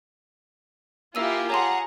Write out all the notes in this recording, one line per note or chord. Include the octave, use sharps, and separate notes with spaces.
A#3 E4 F4 G4 E5 G#5 E6 D#7
G#4 C#5 F#5 A5 A#5 C6